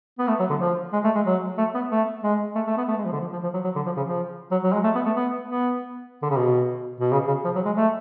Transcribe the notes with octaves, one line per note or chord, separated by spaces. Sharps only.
B3
A3
F#3
D3
F3
G#3
A3
G#3
F#3
A3
B3
A3
G#3
A3
A3
B3
A3
G#3
F3
D3
F3
F3
F3
F#3
F#3
D3
F3
C#3
F3
F#3
F#3
G#3
A3
B3
A3
B3
B3
D3
C#3
B2
B2
C#3
C#3
F3
F#3
G#3
A3